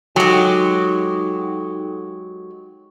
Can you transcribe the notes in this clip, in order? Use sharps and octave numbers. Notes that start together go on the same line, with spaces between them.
F#3 G#3 D#4 F#4 G4 A4